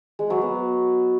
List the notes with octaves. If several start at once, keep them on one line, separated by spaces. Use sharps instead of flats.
G#3
F#3
B3